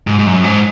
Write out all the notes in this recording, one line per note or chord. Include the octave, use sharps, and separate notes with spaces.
G#2
G#2
F#2
G#2